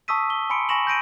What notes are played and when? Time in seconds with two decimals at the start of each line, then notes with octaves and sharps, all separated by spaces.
0.08 A5 C#6 D#6 E6 B6 D#7
0.30 G7
0.50 G#5 B5 C6 C#7 D7
0.69 G#5 B5 C#6 A#6 E7 F#7
0.87 G6 A#6 D7 D#7